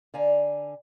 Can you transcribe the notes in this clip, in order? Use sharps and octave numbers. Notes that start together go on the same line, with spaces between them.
D3 D5 F5 G#5 A#5